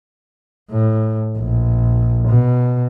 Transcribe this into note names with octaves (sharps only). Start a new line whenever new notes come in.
A2
A#1
B2